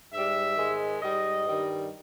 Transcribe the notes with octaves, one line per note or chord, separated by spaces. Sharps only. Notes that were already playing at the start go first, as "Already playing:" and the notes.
G#2 G3 E5
G#2 D#3 G#3
G#2 G3 D#5
G2 D#3 G3